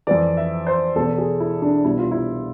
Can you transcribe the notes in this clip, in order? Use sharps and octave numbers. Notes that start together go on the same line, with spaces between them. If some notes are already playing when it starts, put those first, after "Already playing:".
F2 E3 D5
E5
C5
E2 B2 A4
G#4
E4
D4
C2 B2 E4
F4
E4